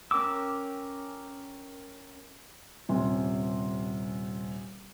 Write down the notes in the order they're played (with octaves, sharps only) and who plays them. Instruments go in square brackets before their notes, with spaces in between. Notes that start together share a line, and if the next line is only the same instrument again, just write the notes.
[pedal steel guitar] C#4 A#4 G5 D6 E6
[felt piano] D#1 C3 C#4 C6